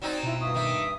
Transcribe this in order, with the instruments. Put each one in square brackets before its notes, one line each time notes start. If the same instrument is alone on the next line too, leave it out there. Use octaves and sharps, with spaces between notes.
[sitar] F#3 C4 D#4 [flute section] D5 G#5
[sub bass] B2 [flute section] E4 F4 A#5
[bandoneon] G2 D#6 [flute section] F4 E5 C#6
[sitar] D#3 A#3 [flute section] E5 D6